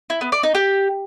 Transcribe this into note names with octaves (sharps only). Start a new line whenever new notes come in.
E4
B3
D5
D#4
G4